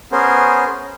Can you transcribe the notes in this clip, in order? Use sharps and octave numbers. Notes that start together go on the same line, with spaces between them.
B3 C#4 G#4 A#4 C5